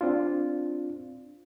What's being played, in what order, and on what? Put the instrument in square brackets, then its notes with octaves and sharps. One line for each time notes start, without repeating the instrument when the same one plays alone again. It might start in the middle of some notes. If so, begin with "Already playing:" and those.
[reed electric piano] C4 D4 F4